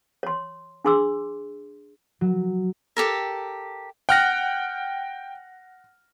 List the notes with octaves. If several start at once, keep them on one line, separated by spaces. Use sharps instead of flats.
C#5 C6
D4 G#4 C6 D6 E6
F#3
G4 A4 A#4
F#5 G5 F6 A#6